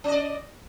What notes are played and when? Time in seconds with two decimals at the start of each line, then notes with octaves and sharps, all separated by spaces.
0.04 C#4
0.08 D#5
0.12 D5